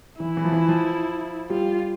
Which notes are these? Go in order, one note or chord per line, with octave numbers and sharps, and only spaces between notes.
E3 E4
E3
F3
E3
F3
G3 F4